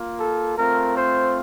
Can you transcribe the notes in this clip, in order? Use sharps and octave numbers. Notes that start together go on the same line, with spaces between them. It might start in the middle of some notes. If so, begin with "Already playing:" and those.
Already playing: A#3 F4
A4
A3 C4 F4 A#4
C5